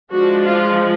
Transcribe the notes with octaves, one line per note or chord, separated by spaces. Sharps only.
F3 G#3 D4 F#4
F4